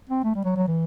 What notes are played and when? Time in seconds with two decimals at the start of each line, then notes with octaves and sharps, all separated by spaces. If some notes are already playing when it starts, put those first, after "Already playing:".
0.09 C4
0.24 A3
0.35 G3
0.45 F#3
0.56 F#3
0.68 E3